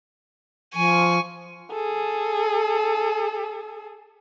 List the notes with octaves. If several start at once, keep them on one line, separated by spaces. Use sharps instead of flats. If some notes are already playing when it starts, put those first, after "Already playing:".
F3 G#5 C#6
G#4 A4